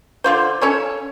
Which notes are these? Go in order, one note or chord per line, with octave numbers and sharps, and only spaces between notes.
D3 F4 C5
C#4 A4 C#5